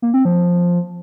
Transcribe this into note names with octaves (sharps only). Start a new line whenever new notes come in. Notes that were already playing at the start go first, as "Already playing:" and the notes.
A#3
C4
F3